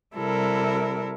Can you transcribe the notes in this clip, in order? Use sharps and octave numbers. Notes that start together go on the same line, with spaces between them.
C3 G3 E4 A4 A#4